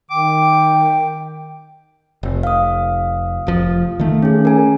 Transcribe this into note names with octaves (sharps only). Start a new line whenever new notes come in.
D#3 G5 D6
F1
F5 D#6
F1 F3
D#3 A3
C#4 G#4
A#4 G#5